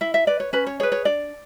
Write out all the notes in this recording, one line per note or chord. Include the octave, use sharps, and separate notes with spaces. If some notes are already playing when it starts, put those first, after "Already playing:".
E4 E5
E5
B4 D5
C#5
C#4 B4
C#5
G#4 B4 C#5
C#5
D4 D5